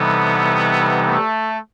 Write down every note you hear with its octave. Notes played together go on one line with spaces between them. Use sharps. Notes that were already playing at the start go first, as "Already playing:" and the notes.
Already playing: C3 E3 G3 B3 D#4 A4
A3